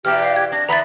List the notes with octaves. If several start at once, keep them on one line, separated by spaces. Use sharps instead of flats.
E2 B2 G4 F6
F5
G#6
D4 A#6
D3 E3 B3 A#5 B5 A6